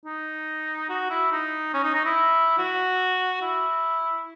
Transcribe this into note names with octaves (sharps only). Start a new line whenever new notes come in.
D#4
F#4
E4
D#4
C#4
D#4
D#4
E4
F#4
E4